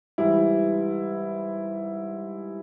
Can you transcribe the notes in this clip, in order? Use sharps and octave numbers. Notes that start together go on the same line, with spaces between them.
G#2 E3 G3 E4